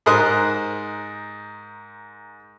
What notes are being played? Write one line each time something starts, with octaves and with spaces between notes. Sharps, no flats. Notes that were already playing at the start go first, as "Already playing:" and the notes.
G#2 A#4 C5 D#6 F#6